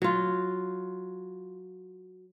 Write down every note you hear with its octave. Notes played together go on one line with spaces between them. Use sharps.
F#3 F4